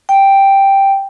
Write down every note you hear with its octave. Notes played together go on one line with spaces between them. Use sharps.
G5